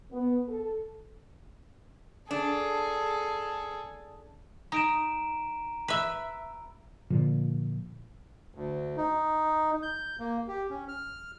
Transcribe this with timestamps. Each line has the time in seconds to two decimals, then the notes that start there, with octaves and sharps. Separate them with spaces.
0.12 B3
0.49 A4
2.31 D4 G#4 A4
4.72 D#4 A#5 D7 E7
5.88 B4 E5
7.10 A#2 D3 F3
8.55 D2
8.97 D#4
9.82 G6
10.20 A#3
10.48 G4
10.70 C#4
10.88 F6